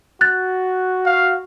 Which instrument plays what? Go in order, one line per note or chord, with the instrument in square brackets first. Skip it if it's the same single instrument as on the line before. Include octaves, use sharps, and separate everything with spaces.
[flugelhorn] F#4 [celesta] F#6 A6
[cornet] F5